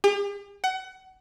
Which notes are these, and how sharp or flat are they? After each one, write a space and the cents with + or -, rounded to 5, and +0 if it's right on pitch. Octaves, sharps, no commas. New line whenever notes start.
G4 +45
F#5 +25